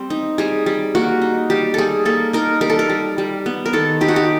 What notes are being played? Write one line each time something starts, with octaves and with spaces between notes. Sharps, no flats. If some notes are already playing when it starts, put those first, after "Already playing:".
Already playing: G3 C4
D#4
G3 G#4
G3
A#3 F#4
D#4
G3 G4
G3 G#4 A4
A#3 A4
D#4 A#4
G3 A#4
A4
A#4
G3
G3
B3
A#4
D#3 A4
D#4 G4
F#4
G4